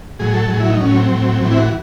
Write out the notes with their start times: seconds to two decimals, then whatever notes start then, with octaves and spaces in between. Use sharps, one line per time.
0.19 A2 F#3 G#4
0.34 A4
0.50 A2 F#3 G#4
0.60 E4
0.70 D#4
0.81 A2 F#3 C#4
0.96 C4
1.12 A2 F#3
1.42 A2 E3 C4
1.52 E4
1.58 F#4